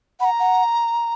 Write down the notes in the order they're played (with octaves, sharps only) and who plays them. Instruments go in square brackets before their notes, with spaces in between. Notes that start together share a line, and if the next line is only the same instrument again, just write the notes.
[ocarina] F#5 [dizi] B5
[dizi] A#5
[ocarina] F#5